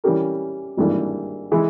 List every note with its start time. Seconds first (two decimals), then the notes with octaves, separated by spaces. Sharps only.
0.04 E3 G3 C#4 G4 A#4
0.77 G#1 G2 E3 A#3
1.52 E3 G#3 E4